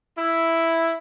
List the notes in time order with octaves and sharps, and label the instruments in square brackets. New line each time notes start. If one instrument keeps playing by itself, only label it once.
[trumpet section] E4